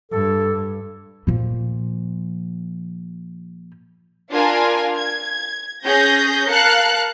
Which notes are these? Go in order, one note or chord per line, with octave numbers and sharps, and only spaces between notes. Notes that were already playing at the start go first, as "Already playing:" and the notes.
G2 A4
A#2 F3
D4 F4 A#4 F5 G#5
G#6
C#4 G#4 G6 A#6
A#4 F5 A5 F#6 C#7